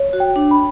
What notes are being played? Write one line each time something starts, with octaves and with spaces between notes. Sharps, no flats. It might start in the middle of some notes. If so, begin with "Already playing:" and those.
Already playing: C#5
F#4
G5
D4
B5